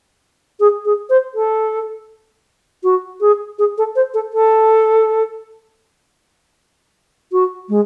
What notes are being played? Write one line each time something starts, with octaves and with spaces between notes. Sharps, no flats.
G#4
G#4
C5
A4
F#4
G#4
G#4
A4
C5
A4
A4
F#4
G#3